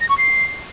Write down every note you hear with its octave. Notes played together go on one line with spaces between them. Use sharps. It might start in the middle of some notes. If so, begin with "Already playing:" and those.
A#6
C#6
C7